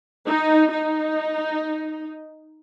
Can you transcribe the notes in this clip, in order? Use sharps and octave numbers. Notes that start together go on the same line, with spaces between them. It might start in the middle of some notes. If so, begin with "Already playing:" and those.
D#4
D#4